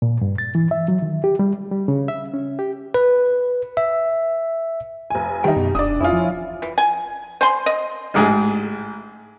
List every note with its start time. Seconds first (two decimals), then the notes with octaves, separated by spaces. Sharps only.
0.02 A#2
0.21 G2
0.38 A6
0.55 E3
0.71 E5
0.88 F#3
1.02 D#3
1.24 G4
1.39 G3
1.71 G3
1.88 C#3
2.08 E5
2.34 C#4
2.59 G4
2.94 B4
3.77 E5
5.10 F1 G#5
5.44 D#3 G3 D#4 G5
5.56 F#2 B2
5.75 E1 D4 D5 D#6
6.01 F2 C#4 E4 F4
6.13 F3
6.62 E3
6.78 G#5
7.41 C5 G#5 C6
7.66 D#5
8.14 A1 G#2 G#4